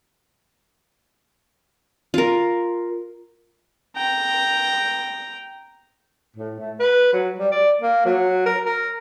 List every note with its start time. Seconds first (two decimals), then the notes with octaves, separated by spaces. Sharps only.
2.14 F4 A#4
3.96 G5 A#5
6.36 A2
6.59 A3
6.80 B4
7.13 F#3
7.39 G3
7.51 D5
7.82 A#3
8.05 F#3
8.46 A#4
8.66 A#4